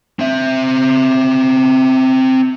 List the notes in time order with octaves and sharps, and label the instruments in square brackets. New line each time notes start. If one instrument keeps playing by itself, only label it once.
[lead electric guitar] C4 E5